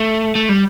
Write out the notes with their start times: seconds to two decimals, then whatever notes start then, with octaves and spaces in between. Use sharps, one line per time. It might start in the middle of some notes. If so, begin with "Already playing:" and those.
Already playing: A3
0.35 A3
0.49 G3